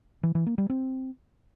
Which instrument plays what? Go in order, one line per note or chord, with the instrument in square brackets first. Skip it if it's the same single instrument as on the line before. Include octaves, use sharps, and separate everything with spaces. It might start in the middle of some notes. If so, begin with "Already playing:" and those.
[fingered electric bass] E3
E3
A#3
G3
C4